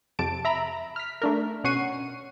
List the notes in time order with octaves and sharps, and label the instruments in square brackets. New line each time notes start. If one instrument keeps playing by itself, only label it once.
[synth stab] F2 C3 A5 D7
E5 A#5 B5
F6 B6
A3 D4 A#4
B2 C#4 F#5 C#6 C7 D#7